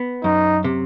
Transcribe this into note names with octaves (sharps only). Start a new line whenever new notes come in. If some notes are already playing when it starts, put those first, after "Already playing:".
Already playing: B3
F#2 D#4
C3